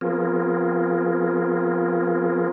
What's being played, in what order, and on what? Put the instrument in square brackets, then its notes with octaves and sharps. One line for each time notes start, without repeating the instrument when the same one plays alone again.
[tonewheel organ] F3 B3 C4 F4 G#4 A#4